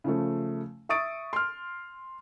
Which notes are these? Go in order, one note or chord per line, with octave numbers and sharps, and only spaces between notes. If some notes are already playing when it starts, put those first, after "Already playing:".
C#3 F3 A3
E5 C#6 D#6 A6 D7
C6 F6